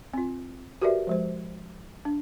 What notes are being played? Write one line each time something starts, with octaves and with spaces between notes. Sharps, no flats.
C4 F4
F#4 G4 A#4 B4 D5 E5
F3 G#3 C5
D4